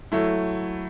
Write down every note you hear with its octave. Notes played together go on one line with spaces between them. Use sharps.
F#3 A3 E4